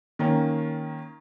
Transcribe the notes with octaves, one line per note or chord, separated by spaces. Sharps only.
D#3 A#3 C#4